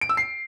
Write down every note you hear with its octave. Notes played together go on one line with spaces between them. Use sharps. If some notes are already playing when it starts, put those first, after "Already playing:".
D7
E6
C7